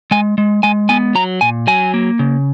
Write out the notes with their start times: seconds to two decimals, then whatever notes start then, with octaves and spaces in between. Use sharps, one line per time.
0.11 G#3 G#5
0.38 G#3
0.63 G#3 G#5
0.89 B3 G#5
1.15 F#3 A#5
1.41 A#2 G#5
1.67 F#3 G#5
1.94 A#3
2.19 C#3